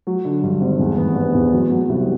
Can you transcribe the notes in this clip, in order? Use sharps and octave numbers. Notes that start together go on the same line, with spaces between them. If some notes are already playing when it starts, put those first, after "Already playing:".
F#3
D3
G2
G#1
E2
B3
B3
E2
F#3
F#3
C2